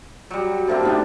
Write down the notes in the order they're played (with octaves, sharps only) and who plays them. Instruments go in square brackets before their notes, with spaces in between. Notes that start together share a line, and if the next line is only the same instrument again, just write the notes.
[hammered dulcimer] F#3 G3
[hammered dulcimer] D3 A#3 C4 [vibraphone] G4 C5 E5
[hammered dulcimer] A2 B3 D4 [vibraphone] D#4 F#4